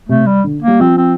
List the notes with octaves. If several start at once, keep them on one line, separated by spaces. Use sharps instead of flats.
C3 A3
G3
D3
A#3
G3
F3 C4
C4